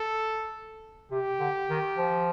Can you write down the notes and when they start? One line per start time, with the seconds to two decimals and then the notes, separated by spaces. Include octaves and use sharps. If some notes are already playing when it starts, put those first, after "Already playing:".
Already playing: A4
1.11 C3 G4
1.40 D3
1.70 D#3
1.98 F3